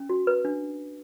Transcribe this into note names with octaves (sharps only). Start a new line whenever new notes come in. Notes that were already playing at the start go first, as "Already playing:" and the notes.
Already playing: C#4
F#4
B4
D4